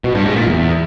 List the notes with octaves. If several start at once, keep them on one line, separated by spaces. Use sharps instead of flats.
B2
G2
G#2
A#2
E2